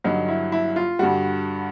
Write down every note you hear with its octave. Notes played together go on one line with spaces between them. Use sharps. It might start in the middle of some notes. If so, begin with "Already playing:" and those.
G2 D3 F#3 D#4
E4
E4
F4
G2 D3 G3 F#4